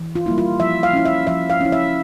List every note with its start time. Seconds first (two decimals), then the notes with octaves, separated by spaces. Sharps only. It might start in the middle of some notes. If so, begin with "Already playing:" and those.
Already playing: E3
0.15 F4
0.26 G3 A#3 E4
0.38 F4
0.60 F3 E5
0.83 F5
0.93 C#4 E4
1.05 E5
1.27 F3 E5
1.50 F5
1.61 C#4 E4
1.72 E5